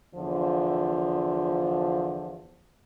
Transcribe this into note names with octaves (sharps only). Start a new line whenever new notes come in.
E2 D3 F3